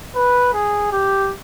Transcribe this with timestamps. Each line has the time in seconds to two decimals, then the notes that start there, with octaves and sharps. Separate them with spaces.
0.16 B4
0.53 G#4
0.92 G4